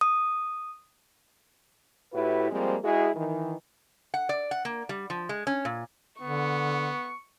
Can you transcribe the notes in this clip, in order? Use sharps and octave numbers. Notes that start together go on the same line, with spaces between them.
D#6
A2 E4 F#4 G4 B4
F3 G3 G#3 A#3 C4
G#3 E4 F#4 G#4
D#3 E3
F#5
D5
F#5
A#3
G3
F3
G#3
C#4
A#2
D3 B3 C#6